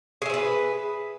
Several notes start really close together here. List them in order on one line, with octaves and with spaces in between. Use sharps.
G#4 E5 C5 B4